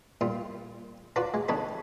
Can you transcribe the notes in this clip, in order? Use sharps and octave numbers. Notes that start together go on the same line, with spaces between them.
A#2 G3 F4
F4 F#4 B4 D5 A#5
G#3
B1 D3 D#4 A4 C#5 B5